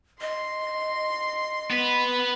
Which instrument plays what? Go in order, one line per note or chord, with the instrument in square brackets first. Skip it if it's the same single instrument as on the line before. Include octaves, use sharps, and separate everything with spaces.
[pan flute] D#5 [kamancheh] C6
[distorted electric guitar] B3 B4